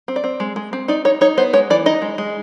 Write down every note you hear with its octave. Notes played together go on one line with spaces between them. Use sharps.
C4
D5
C4
G#3
G#3
C4
D#4 D5
D#4 C#5
D#4 C#5
B3 C5
G#3 C#5
E3 D5
D#4 D#5
G#3
G#3